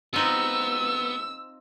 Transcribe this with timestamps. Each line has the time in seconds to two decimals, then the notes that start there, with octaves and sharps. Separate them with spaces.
0.14 B3 C4 D#4 F4 E6